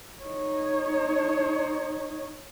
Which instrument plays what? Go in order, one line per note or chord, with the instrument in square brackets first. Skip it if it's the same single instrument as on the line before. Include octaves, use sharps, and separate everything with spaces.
[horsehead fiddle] D#4 C#5